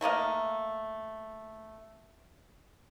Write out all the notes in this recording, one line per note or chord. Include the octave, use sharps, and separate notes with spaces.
A3 A#3 D#5 F5